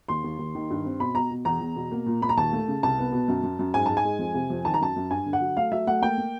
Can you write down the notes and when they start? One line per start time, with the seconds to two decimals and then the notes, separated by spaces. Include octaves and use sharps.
0.08 D#2 C6
0.24 D#2
0.39 D#2
0.55 D#3
0.70 G2
0.86 C4
1.00 B2 B5
1.15 B2 A#5
1.31 B2
1.45 E2 A#5
1.61 E2
1.76 B2
1.91 A#3
2.06 A#2
2.22 A#2 B5
2.29 A#5
2.37 D#2 A5
2.53 A3
2.68 C#3
2.83 C2 A5
2.99 B3
3.13 B2
3.28 F#2
3.43 F#2
3.59 F#2
3.74 G#2 G#5
3.86 G#2 A5
3.97 G#5
4.04 G#3
4.19 F2
4.34 C3
4.50 F2
4.65 D#3 A5
4.74 A#5
4.81 F#2 A5
4.96 F#2
5.11 G2 G#5
5.26 D3
5.33 F#5
5.41 F#3
5.57 A3 F5
5.72 F#3 E5
5.87 A3 F#5
6.02 A#3 G5
6.18 A#3